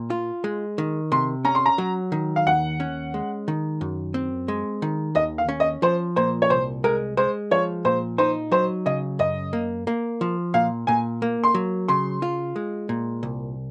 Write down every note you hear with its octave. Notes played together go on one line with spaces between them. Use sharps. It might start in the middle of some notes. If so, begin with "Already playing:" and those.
Already playing: A#2
F4
G#3
D#3
C3 C6
C#4 A#5
C6
A#5
F#3
D#3
F5
D#2 F#5
C#4
G#3
D#3
F#2
C4
G#3
D#3
D#2 D#5
F5
C#4
D#5
F3 C5
A#2 C5
C#5
C2 C5
G#3 A#4
G#3 C5
F3 C#5
A#2 C5
D#4 C5
F#3 C5
C#3 D#5
F#2 D#5
A#3
A#3
F3
A#2 F5
A#2 G#5
A#3
C6
F#3
C#3 C6
F4
G#3
A#2
C2